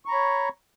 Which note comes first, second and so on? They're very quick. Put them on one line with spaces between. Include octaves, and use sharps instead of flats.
C#6 A#5 B5 C#5